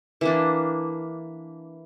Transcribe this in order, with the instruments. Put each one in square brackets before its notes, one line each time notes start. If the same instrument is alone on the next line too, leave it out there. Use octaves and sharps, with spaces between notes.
[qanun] E3 A#3 D4